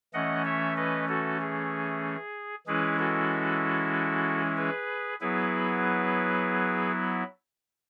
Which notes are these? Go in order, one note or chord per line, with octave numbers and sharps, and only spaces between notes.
E3 A3 C#4 D#5 F#5
C#5 E5
B4 D#5
F#4 A4
G#4
E3 G#3 C#4 E4 G#4 B4
F#4 A4
G#4 B4
F#3 B3 E4 G#4 B4